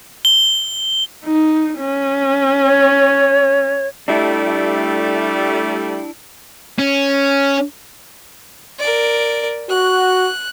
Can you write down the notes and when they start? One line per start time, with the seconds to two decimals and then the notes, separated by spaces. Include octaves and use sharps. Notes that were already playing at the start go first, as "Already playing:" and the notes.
0.25 G7
1.25 D#4
1.80 C#4
2.64 C#5
4.08 G3 A3 D4 E4
6.79 C#4
8.79 A#4 D5
9.70 F#4 F#6